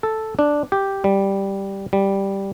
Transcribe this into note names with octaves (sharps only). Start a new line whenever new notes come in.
A4
D4
G4
G3
G3